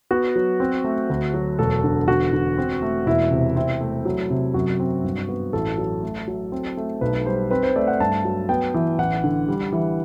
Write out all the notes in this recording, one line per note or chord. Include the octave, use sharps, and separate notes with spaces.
B3 F#4
F#3
C4
A3
D2
F#3
E1 A4
D3
E1 F#4
D3
C4
A3
E1 E4
C3
C4 E4
A3
F#3
C3
F#2 F#4
C4
G2
B3
A1 A4
F#3
A3
F#3
C4
A3
B1 B4
G3 C5
C4 B4
C5
A3 D5
F#5
G2 A5
F#3
B3 G5
E3
A1 F#5
D3
G3
E3